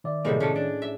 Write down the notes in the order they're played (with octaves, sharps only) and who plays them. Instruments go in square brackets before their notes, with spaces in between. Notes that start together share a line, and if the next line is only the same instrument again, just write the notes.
[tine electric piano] D#3 D5 E5
[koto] A2 G#3 [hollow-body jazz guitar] C3 G3 A#3
[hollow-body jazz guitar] C3 A4 [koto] C#4
[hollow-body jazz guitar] D4
[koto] E5